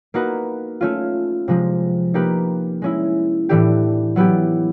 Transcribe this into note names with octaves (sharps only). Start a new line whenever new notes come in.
A#3 D#4 F#4 B4
A3 C#4 F4
C3 F3 G#3
A#3 D#4 G4 B4
G#3 C#4 E4
A2 E3 A3 D4 G4
F#3 B3 E4 G4